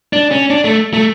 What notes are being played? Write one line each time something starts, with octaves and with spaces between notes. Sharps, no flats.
D4
C#4
D4
A3
A3